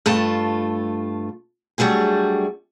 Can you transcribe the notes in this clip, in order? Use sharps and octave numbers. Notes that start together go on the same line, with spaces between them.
G2 A3 F4 A5
F#3 G3 A3 D4 G#4